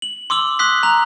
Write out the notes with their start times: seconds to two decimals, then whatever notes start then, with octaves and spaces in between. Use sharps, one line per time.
0.02 F#7
0.30 C6 D6 E6 F#7
0.59 C6 D#6 F#6 B6
0.83 A#5 F#6 F7